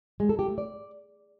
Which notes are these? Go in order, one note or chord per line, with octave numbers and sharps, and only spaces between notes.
G#3
A4
G4
A3
D5